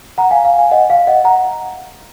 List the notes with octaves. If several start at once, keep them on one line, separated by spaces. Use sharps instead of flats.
F#5 A#5
F5 G#5
F5
F5 G#5
D#5 F#5
F5
D#5 F#5
F#5 A#5